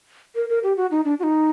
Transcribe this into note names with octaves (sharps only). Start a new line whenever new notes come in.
A#4
A#4
G4
F#4
D#4
D4
F#4
D#4